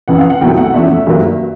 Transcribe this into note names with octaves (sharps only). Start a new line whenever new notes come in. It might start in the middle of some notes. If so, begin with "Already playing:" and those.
F2 C#3 E3 F#5
F5
F#5
C2 B2 F#3 A3 G5
F#5
E2 C#3 F3 A3 E5
G2 D#3 F#3 A#3